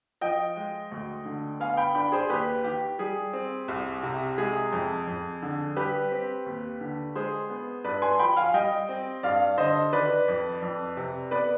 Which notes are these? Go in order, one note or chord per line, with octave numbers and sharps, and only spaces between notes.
F3 D#5 G5
G#3
D2
D3
B3 F5 G#5
G5 B5
D4 G5 B5
G#4 C5
D#2 G4 B4
D#3 G4
G3 G#4
C4
C2
C3
G#3 G#4
F2
F2
D3
G3 G4 B4
C4
D#2
D3
G#3 G#4 C5
B3
G2 B4 D5
G#5 C6
F3 G5 B5
F5 G#5
G3 D#5 G5
C4
G2 D5 F5
D3 C5 D#5
D#3 B4 D5
F2
F2
C3
B3 B4 D5